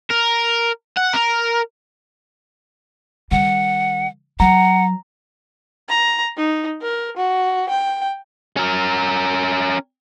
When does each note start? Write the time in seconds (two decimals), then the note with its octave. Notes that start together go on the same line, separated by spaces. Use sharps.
0.11 A#4
0.97 F#5
1.13 A#4
3.31 D#3 G3 F#5
4.40 F#3 F#5 A#5
5.89 A#5
6.37 D#4
6.82 A#4
7.17 F#4
7.69 G5
8.57 C#4 A#4